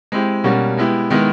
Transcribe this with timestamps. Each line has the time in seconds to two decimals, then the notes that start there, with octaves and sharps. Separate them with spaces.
0.12 G#3 C4 E4 G4
0.44 B2 G3 A#3 C#4 F#4
0.77 G#3 B3 E4 G4
1.10 D#3 G#3 B3 E4